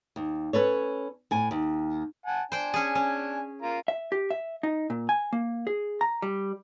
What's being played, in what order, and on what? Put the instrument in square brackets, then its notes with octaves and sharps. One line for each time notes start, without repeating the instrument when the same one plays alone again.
[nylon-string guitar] D#2
C#4 A4 B4 C#5
A2 G#5
D#2
[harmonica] F#5 G#5 A5
[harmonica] D4 G#5 [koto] C5 G5
[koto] C#4 G#4
C#4
[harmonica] F4 A#4 A#5
[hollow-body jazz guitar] E5
G4
E5
D#4
A#2
G#5
A#3
G#4
A#5
G3